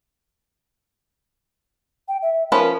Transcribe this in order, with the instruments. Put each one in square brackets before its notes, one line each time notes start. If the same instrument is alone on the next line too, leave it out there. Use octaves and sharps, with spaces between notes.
[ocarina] G5
E5
[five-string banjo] F3 C#4 B4 [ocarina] A#4